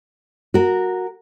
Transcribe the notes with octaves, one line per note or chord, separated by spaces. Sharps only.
F#4 A#4